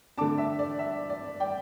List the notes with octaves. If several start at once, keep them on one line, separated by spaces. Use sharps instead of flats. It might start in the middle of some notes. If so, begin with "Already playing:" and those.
D3 A3 D4 A5 D6
E5
D5
E5
D5
D5 G5